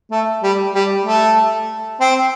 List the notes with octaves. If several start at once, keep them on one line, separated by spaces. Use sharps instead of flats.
A3
G3
G3
A3
C4